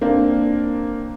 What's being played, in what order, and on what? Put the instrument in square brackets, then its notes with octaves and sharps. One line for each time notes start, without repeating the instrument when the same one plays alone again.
[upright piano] A#3 C4 D4